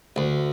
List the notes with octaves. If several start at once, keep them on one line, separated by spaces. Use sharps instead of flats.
D2